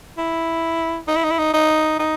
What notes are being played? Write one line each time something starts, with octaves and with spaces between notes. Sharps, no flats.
E4
D#4
E4
D#4
E4
D#4
D#4
D#4